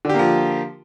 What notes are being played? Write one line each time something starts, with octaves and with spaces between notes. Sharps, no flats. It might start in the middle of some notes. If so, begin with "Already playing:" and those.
D3 F3 A#3 G4